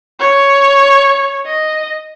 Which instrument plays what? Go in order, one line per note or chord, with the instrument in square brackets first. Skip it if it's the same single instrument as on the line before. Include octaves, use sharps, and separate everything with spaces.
[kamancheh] C#5
D#5